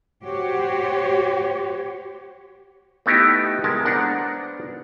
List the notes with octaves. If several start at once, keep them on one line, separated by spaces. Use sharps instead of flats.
F#4 G4 C5 C#5
A3 B3 D#4 E4 G4
G#3 A#4 A5
B3 D4 A#4 C5 F#5